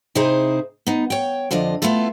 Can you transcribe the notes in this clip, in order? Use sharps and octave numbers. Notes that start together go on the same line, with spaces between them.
C3 D#4 E4 G#4 C5
B3 D#4
C#5 G5
F2 D3 D4 F4 D#5
A3 B3 E4 F4 A4